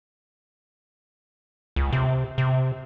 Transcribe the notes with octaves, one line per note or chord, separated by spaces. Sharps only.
C#2
C3
C3